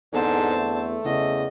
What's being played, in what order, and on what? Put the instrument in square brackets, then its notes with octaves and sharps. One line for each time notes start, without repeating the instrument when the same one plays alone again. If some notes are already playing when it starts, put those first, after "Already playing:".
[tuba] E2 [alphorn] G#2 [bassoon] D3 [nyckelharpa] C4 A5
[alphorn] A3
[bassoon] E2 [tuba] C#3 [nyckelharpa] D#5